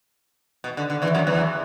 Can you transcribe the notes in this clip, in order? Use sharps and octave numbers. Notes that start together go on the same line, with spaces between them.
B2
D3
D3
E2 E3
F#2 F#3
E2 E3